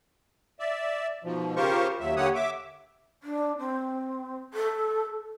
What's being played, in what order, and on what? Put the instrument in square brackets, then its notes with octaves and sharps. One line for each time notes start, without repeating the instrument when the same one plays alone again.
[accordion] D5 E5
G#2 B2 F3
C#3 F4 G4 A#4 C5 C#6
D#2 F#3 E5
D3 A#3 G4 C#5 F#5 D#6
E5 D6
[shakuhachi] D4
C4
A4